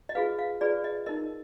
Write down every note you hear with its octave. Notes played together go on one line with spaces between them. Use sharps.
D#5
F4 G#4 B4 F5
F5
F4 G#4 B4 D5
D#5
D#4 A#4 D#5